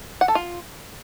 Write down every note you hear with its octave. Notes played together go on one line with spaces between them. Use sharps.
F#5
A4
F4